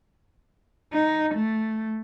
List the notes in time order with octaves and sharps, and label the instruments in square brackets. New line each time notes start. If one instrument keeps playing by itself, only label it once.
[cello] D#4
A3